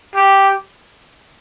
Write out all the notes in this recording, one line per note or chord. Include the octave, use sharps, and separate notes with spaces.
G4